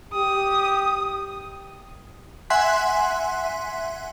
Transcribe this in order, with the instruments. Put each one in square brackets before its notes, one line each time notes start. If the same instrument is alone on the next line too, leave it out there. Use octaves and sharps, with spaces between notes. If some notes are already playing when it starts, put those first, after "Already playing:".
[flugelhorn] G4 [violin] D#6
[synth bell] E5 F#5 G#5 C6 F#6 B6